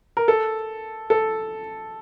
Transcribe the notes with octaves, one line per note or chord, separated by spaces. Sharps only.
A#4
A4
A4